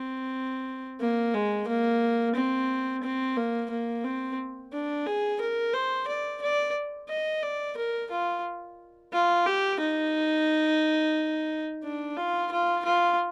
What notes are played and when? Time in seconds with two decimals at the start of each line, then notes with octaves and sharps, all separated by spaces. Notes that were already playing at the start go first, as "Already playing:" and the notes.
Already playing: C4
1.00 A#3
1.34 G#3
1.67 A#3
2.35 C4
3.03 C4
3.37 A#3
3.70 A#3
4.04 C4
4.73 D4
5.06 G#4
5.40 A#4
5.73 C5
6.07 D5
6.42 D5
7.09 D#5
7.43 D5
7.77 A#4
8.11 F4
9.13 F4
9.46 G4
9.80 D#4
11.84 D4
12.17 F4
12.51 F4
12.85 F4